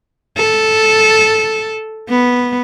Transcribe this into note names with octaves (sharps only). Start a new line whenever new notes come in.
A4
B3